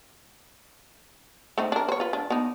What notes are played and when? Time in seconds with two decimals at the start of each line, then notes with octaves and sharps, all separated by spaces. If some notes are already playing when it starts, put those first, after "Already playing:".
1.58 A3 C4 D#4
1.72 D4 A#4
1.88 C5 C#5
2.00 F4 B4
2.13 D4
2.30 B3 D4 D#4